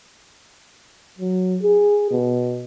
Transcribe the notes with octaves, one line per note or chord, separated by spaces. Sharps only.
F#3
G#4
B2